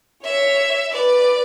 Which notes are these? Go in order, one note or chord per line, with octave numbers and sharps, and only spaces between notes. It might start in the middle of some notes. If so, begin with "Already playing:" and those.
C#5 E5
B4 D5